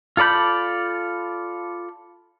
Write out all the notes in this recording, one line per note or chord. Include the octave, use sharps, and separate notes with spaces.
F4 A4 D5 B5 G6